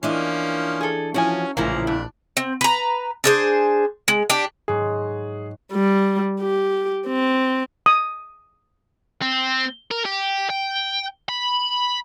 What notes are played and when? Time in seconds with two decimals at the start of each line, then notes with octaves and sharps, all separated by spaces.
0.03 E3 F3 A#3 C#4 D4 D#5
0.81 G#4 A4
1.14 E3 F3 C#4 F#4 G#5
1.57 A#1 A2 C#3 E3 F3 A#3 E4 A#5
1.87 F2 D4
2.37 C4
2.61 B4 A#5
3.24 D4 G#4 C5
4.08 G#3
4.30 D4 G4
4.68 G#2 F#3 G#4
5.73 G3
6.41 G4
7.07 C4
7.86 D#6
9.22 C4
9.91 A#4
10.05 G4
10.50 G5
11.29 B5